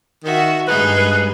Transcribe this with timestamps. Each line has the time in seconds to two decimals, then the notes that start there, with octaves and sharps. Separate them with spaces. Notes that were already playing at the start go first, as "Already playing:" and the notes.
0.24 D#3 F#4 E5
0.67 G2 G#3 D#4 G#4 B4
0.97 B4